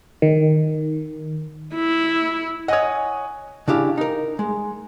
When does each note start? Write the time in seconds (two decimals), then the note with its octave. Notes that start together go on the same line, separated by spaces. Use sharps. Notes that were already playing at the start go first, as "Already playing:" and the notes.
0.22 D#3
1.75 E4
2.68 C#5 D#5 F#5 G#5 D#6
3.68 C#3 D4 E4 G4 F5
3.98 D#4 A#4
4.39 G#3